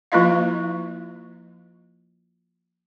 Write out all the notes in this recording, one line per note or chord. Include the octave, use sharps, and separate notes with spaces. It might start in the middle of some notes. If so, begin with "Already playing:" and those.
F3 A#3 E4 F4 D#5 F5